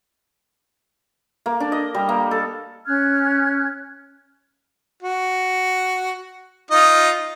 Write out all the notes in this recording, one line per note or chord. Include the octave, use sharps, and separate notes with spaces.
A#3
D4
D#5
G3
A#3
A4
C#4 F6 F#6 G#6
F#4
D#4 F4 D#5